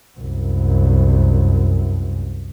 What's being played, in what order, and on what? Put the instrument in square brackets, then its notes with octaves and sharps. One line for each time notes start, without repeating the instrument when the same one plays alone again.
[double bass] C2 F#2